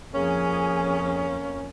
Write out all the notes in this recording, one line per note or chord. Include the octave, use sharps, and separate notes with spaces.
F2 A#3 C#4 G#4 G#5